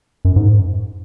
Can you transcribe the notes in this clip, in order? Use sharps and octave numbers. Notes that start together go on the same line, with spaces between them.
F#2
G#2